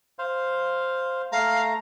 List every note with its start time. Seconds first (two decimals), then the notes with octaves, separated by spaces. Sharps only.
0.19 C5 F5
1.32 A3 F5 A#5